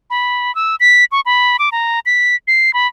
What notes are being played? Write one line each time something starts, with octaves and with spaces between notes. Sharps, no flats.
B5
E6
B6
C#6
B5
D6
A#5
B6
C7
B5